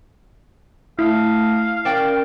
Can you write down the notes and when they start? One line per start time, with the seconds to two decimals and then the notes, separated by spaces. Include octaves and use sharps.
0.99 A3 E4 F5 A5 D#6
1.85 C#4 A#4 D5 G5